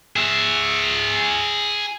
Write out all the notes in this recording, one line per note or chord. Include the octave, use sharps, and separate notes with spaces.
G#4 E5